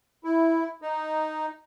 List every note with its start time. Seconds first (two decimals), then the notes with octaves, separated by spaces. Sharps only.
0.24 E4
0.82 D#4